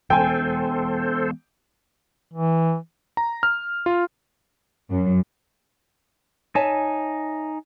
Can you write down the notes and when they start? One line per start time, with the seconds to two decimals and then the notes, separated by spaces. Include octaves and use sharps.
0.10 E3 G#3 B3 A4 C5 G5 G#5
2.34 E3
3.17 A#5
3.43 F6
3.86 F4
4.91 F#2
6.55 D#4 C#5 E5 G#5 A5